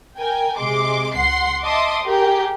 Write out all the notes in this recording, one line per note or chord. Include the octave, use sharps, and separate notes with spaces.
A#4 G5 G#5
C3 G#3 C6 D6
C#2 F#5 C6 C7
D#5 E5 A5 C6 D6 D#6
G4 G#4 A#4